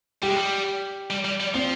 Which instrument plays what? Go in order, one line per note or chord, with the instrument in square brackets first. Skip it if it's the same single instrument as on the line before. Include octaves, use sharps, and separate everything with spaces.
[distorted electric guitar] G3 [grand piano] G4
[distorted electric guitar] G#3
G3
G3
G3
G3
[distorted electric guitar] F3 [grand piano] C4